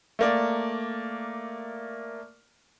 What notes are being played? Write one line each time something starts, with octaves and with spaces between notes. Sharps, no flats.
A3 A#3 D5